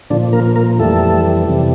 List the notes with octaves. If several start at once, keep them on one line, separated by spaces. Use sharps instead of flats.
A#2 D3 F3 D4
A#3 A#4
A#3 A#4
F2 E3 G3 A3 A4
F2 C3 E3 G3